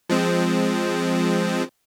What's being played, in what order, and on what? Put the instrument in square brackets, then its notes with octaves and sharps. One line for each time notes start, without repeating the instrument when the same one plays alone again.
[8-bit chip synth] F3 G#3 C4